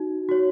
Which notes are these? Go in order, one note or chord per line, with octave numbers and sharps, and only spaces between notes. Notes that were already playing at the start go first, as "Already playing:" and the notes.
Already playing: D#4 F#4
F#4 C#5